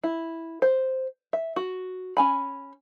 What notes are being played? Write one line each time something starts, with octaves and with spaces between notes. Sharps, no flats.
E4
C5
E5
F#4
C#4 G#5 B5